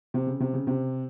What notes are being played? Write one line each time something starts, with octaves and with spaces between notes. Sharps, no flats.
C3
C#3
C3
C#3
C3